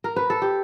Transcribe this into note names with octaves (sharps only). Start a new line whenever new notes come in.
A#4
B4
A4
G4